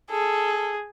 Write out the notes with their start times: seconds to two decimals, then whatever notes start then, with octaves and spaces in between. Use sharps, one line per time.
0.11 G#4 A4